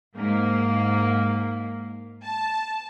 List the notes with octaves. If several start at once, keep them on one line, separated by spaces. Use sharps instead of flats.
G#2 A#3
A5